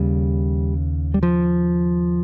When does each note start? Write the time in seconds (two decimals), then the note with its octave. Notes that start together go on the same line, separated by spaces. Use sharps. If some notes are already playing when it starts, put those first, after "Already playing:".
Already playing: D#2 C#3 G3
1.14 G3
1.23 F3